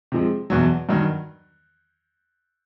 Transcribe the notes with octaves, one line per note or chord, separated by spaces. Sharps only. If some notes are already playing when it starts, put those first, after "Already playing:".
C3 F3 G#3
E2 B2 F#3
G2 D#3 F#3